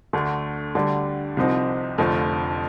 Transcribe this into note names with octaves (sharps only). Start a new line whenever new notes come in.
D2 D3 A3
D2 D3 G3 D4
C2 C3 F3 C4 D#4
F1 F2 D3 F3 A3